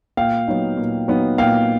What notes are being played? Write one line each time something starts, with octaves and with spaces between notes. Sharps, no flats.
A#2 F5 G5
F#3 B3 D#4
A#2
F#3 B3 D#4
A#2 F5 G5